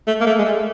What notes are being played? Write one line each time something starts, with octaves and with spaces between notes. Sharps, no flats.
A3
A#3
A3
G#3
A3